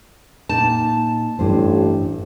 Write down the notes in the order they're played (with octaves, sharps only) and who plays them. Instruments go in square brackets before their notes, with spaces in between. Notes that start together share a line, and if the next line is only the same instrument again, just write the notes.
[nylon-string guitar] A#2 D#4 [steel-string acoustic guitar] A5
[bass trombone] A1 [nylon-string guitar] G2 C5